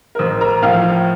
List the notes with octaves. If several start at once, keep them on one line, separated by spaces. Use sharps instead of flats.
A#4
A1 C5
A#4 A#5
A2 F3 F5 F6